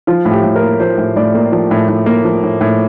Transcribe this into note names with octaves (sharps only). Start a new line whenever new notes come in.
F3 F4
A2
G4
A2
A#4
A#3
F3 C5
A2
A2 D5
A#3
F3
A2
A2
A#3
F3
A2
A2